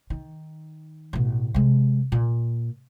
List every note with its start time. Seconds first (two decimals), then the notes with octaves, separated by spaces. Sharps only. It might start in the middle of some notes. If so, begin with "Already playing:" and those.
0.10 D#3
1.13 A1 B2
1.54 C3 G#3
2.12 A#2